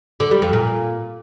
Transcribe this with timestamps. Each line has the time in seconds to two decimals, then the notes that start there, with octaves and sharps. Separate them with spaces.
0.20 D3
0.31 G3
0.42 F2
0.53 A#2